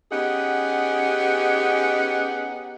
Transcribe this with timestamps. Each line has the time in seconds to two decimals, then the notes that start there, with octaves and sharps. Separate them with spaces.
0.12 B3 C#4 D#4 G4 G#4 F#5